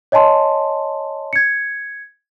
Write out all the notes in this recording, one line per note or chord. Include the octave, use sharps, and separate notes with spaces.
C#5 D#5 G#5 A5 C6
G#6 C#7